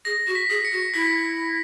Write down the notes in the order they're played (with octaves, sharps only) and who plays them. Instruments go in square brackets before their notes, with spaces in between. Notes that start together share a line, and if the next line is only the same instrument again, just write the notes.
[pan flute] G#4 [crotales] A#6
[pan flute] F#4
[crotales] B6
[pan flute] G#4
[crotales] C#7
[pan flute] F#4
[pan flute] E4 [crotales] B6